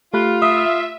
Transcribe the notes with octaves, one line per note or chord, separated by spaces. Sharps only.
A3 F4 G4 B5 F#6
E5 D#6